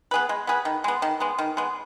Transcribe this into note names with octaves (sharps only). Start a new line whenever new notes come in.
B3 G#4 B4
G#3
B3 G#4 B4
D#3
G#3 B3
D#3
G#3 B3
D#3
G#3 B3